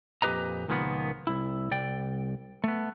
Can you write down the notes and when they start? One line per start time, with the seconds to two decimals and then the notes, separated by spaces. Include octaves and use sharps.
0.22 F2 A#2 G4 B4 D#5 A#5
0.68 C#2 A#2 D#3 F3 A#3 B3
1.27 C2 E4
1.71 C2 D5 G5
2.64 A3 B3